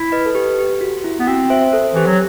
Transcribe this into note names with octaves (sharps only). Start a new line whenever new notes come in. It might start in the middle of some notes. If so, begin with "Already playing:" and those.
Already playing: E4
B4 D#5
A4
G4 B4
G4
F#4
E4
B3
C4 F#4
C5 E5
A4 C5
E3 G4
F#3